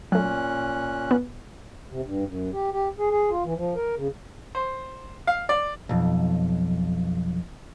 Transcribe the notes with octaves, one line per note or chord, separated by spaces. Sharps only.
A#2 F#3 A3 C#4 F#6
B3
C3
G2
F#2
G4
G4
G#4
G#4
F4
E3
F3
A#4
C#3
C5
F5
D5
B1 F2